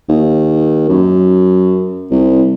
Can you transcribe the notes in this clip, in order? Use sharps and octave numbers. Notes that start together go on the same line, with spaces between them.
D#2
F#2
C2